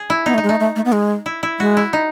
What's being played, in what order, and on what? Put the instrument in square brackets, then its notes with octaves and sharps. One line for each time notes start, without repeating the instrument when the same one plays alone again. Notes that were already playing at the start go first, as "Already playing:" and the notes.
Already playing: [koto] G#4
E4
[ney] B3 [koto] D#4
[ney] A3
[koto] D#4
[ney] G#3
[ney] A3 [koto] D#4
[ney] A3
A3
B3
G#3
[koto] E4
E4
[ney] G#3 [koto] F#4
[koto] E4
D#4